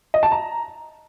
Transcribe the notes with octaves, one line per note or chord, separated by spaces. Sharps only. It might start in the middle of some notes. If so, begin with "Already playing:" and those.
D#5
A5
A#5